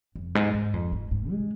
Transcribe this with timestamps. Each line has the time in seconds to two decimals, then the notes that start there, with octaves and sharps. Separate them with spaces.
0.16 F2
0.35 G#2
0.54 G#2
0.74 F2
0.92 G#2
1.11 G#2
1.31 G#3